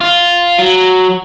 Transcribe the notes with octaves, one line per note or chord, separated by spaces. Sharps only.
F4
F#3